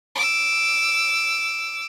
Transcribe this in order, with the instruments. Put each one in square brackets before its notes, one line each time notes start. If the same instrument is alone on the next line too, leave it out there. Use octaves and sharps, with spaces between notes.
[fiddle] D6 E6